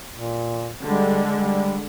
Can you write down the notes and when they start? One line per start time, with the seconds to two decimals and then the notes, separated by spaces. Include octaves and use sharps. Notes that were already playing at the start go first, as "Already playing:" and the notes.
0.14 A#2
0.83 D3 G3 G#3
1.35 G3